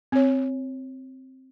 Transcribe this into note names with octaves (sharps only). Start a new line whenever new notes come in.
C4 C#5